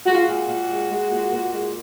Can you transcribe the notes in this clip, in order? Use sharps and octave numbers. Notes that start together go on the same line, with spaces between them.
G#3 F#4
F4
F#4
A#2
A#2
G#3
G#3
A#2
A#2
G#3